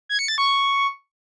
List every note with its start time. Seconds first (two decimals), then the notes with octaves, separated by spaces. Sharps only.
0.09 G#6
0.19 C#7
0.28 A6
0.38 C#6